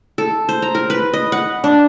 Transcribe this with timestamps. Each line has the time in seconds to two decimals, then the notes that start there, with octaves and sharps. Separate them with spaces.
0.18 A4
0.49 C5
0.62 A#5
0.75 A#4
0.90 B4
1.13 D#5
1.32 F#5
1.64 D4